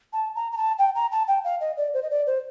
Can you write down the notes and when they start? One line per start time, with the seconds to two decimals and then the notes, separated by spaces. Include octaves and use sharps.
0.13 A5
0.36 A#5
0.52 A#5
0.57 A5
0.79 G5
0.95 A#5
1.12 A5
1.28 G5
1.44 F5
1.61 D#5
1.77 D5
1.94 C5
2.03 D#5
2.11 D5
2.27 C5